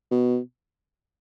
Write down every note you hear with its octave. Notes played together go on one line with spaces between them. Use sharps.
B2